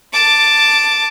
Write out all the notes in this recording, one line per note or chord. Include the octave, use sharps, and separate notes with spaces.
A5 D6